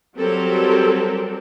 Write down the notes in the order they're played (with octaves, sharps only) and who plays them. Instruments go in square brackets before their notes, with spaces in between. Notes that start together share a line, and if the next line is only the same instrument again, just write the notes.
[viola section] F#3 G3 C4 A4 A#4